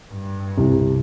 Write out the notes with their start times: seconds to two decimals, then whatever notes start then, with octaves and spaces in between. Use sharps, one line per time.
0.11 G2
0.58 C2